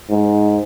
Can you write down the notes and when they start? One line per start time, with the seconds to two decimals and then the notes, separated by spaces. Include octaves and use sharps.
0.10 G#2